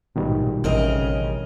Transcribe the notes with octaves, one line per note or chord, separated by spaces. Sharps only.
A#1 G#2 B2 D#3 G3
A1 C#3 C4 C#4 A#4 D#5